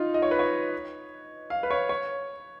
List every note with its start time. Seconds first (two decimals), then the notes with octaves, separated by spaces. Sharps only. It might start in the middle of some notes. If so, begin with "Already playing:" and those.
Already playing: D#4 F4
0.14 D#5
0.22 C#5
0.31 B4
0.39 C#5
1.50 F5
1.63 B4
1.70 C#5
1.89 C#5